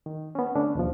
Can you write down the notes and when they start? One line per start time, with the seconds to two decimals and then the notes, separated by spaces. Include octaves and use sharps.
0.06 D#3
0.35 B3 C#4
0.55 D3 A3 C#4 D4
0.75 D#2 B2 F3